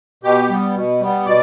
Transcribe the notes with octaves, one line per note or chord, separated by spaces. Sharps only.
B2 G4
G3 B3
B2
G3 B3
B2 D5